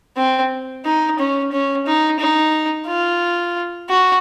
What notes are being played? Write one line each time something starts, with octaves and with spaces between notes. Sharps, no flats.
C4
D#4
C#4
C#4
D#4
D#4
F4
F#4